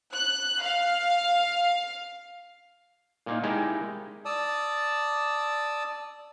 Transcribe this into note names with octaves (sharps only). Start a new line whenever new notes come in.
F#6
F5
A#2 A#3 D#4
G#3 D#4 E4 G4 A#4
D5 A5 D#6 E6